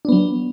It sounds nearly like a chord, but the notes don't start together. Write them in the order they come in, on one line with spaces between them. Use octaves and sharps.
D4 B3 F#3